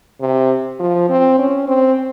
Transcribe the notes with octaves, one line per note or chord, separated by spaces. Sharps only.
C3
F3
C4
C#4
C4